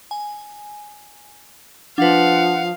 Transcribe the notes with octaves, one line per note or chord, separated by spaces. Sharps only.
G#5
F3 D4 B4 F5 F#5